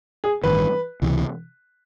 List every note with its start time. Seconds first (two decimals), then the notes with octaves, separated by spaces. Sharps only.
0.24 G#4
0.44 A1 G2 D#3 B4
1.02 C#2 C3 E3